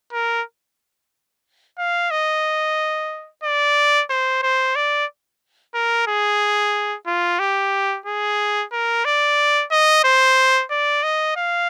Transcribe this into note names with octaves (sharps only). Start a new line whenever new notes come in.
A#4
F5
D#5
D5
C5
C5
D5
A#4
G#4
F4
G4
G#4
A#4
D5
D#5
C5
D5
D#5
F5